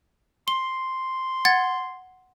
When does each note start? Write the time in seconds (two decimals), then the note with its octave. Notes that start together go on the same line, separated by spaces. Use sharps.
0.48 C6 G7
1.45 F#5 G#6 A6